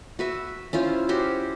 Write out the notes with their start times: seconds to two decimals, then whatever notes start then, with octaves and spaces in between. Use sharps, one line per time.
0.19 F#4 B4 E5
0.73 C#4 E4 F4 C5
1.09 C#4 F#4 G4 C5